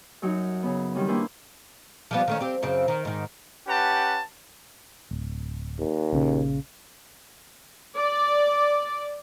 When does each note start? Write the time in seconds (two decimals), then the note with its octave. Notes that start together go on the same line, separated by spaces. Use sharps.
0.22 F#2 F#3 D#4 F#4
0.63 C#3 B3
0.95 D#3 G3 C4 C#4
1.08 A#3 D4 E4 B4 C5 G#5
2.11 F3 G3 B3
2.28 D#3 A3 C#4
2.40 C4 G4
2.63 F#2 C#3 C4
2.88 D#3
3.05 G#2 D#3
3.67 C#4 G4 B4 F#5 G5 A5
5.11 D1
5.79 D#2
6.12 A#1 C#3
7.96 D5